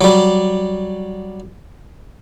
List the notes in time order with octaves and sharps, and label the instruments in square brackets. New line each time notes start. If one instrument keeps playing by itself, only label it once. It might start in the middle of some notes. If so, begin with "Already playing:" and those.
[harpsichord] F#3 G3